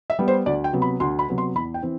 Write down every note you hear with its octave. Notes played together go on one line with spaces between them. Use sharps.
E5
G3 B3
C5
D2 D5
G5
C3 F#3 B3
B5
D2 C6
B5
C3 F#3 B3
C6
E2 B5
G5
E3 C4